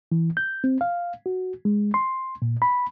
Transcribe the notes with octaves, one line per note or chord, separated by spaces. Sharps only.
E3
G6
C4
F5
F#4
G#3
C6
A#2
B5